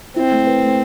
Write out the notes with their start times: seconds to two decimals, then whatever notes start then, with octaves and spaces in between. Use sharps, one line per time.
0.16 C4 E4
0.31 A3
0.47 B4
0.63 A3